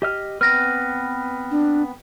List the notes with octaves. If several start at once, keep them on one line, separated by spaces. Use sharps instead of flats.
G4 D#5 F6
B3 C4 B4 F6 A#6
D4